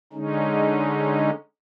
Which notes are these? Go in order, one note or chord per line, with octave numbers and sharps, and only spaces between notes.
D3 G#3 C#4 D#4